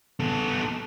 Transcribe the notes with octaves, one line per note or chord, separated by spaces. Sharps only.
B3 A4